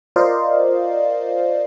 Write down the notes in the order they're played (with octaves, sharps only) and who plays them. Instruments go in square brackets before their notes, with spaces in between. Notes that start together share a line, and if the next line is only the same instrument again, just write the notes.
[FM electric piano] F4 A#4 C5 D5 D#5 F5